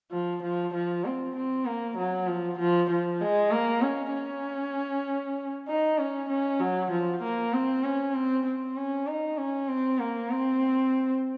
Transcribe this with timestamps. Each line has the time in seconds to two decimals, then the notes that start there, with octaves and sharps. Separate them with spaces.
0.12 F3
0.43 F3
0.74 F3
1.05 C4
1.36 C4
1.66 A#3
1.97 F#3
2.27 F3
2.59 F3
2.90 F3
3.21 G#3
3.52 A#3
3.82 C#4
4.13 C#4
5.68 D#4
5.98 C#4
6.29 C#4
6.60 F#3
6.91 F3
7.22 A#3
7.53 C4
7.84 C#4
8.15 C4
8.45 C4
8.77 C#4
9.07 D#4
9.38 C#4
9.68 C4
9.99 A#3
10.30 C4